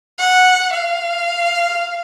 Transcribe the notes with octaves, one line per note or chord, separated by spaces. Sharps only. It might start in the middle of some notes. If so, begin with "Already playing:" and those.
F#5
F5